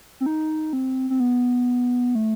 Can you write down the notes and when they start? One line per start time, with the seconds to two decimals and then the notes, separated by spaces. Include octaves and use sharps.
0.20 C4
0.26 D#4
0.73 C4
1.10 C4
1.20 B3
2.15 A3